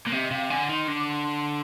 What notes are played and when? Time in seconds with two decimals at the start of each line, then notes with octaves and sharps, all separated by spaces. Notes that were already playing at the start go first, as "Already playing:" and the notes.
0.07 A#2
0.12 C3 D#5
0.31 C3 F5
0.50 D3 G#5
0.69 D#3 C6
0.88 D3 C6
0.97 D6
1.06 C6